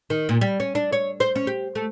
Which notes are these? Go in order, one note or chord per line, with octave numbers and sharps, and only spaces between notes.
D#3
A#2
G3
C#4
D4
C#5
C5
C#4
G4
A3